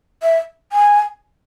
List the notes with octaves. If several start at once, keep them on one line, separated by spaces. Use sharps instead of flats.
E5
G#5